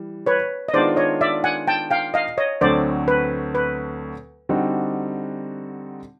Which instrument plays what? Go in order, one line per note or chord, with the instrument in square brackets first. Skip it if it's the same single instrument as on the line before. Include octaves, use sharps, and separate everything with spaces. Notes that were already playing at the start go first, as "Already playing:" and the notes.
Already playing: [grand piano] E3 G3
[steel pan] B4 C#5
D#5
[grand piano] D#3 G#3 B3 D4 F4 [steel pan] C5 D5
[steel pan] C#5 D#5
D5 E5
F#5 G#5
G5 A5
F5 G5
D#5 F5
C#5 D#5
[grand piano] D2 D3 F#3 A3 C4 [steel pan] C5 D5
[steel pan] B4
B4
[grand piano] D3 G3 C4 D#4 F#4